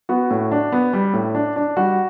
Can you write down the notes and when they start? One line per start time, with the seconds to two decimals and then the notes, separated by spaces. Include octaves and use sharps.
0.09 B3 F#4
0.30 A2
0.52 D4
0.72 B3
0.93 G3
1.13 A2
1.35 D4
1.56 D4
1.77 G3 F#4